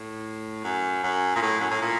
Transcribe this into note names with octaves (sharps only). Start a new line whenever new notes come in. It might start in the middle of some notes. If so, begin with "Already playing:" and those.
Already playing: A2
F#2
F#2
A#2
A2
F#2
A2
A#2